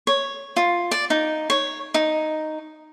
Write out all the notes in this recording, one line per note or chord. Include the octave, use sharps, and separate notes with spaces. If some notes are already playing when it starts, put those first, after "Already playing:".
C#5
F4
D5
D#4
C#5
D#4